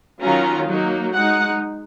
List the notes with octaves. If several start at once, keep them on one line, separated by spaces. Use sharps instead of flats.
D#3 F#3 C#4 F4 A#5
F#3 A#3 D#4
G#3 D#4 F#5